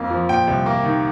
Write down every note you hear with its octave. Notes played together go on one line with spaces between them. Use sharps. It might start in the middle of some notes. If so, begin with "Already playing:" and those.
Already playing: F2 A#3 F5
F3
A#2 G5
C2
A#3
D#3